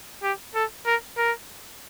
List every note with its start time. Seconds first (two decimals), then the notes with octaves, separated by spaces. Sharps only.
0.23 G4
0.55 A4
0.86 A#4
1.17 A#4